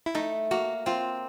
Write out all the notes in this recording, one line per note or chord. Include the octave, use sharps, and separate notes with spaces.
E4
A3 D#4
A#3 F#4
C4 F4